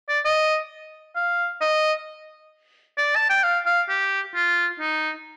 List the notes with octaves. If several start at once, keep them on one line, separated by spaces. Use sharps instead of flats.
D5
D#5
F5
D#5
D5
A5
G5
F5
F5
G4
F4
D#4